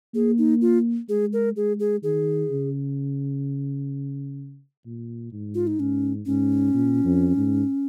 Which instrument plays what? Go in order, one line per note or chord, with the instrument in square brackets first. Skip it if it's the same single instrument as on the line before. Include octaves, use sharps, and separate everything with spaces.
[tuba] A#3 [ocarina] G#4
[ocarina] D#4
F4
[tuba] G#3 [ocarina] G#4
[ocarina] A#4
[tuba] G#3 [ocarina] G#4
[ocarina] G#4
[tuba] D#3 [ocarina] G#4
[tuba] C#3
A#2
G#2
[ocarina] F4
D#4
[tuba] G#2 [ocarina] C#4
[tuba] G#2 [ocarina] C#4
[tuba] A#2
F2
G#2